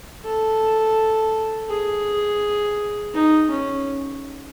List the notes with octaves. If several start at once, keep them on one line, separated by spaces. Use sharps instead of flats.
A4
G#4
D#4
C#4